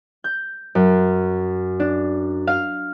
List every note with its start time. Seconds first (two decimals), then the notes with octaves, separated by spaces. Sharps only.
0.24 G6
0.75 F#2
1.80 D4
2.47 F5